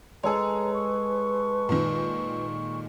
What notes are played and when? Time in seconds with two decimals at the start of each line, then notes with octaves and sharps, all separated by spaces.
0.23 G#3 G#4 A4 B4 C#5 A#5
0.74 C#6
1.69 A#2 D#3